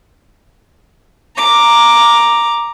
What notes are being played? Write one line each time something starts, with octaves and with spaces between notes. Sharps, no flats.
A#5 D6